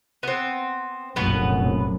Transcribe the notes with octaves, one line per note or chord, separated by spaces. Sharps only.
B3 C4
F1 A#1 F#2 B2 B3 B4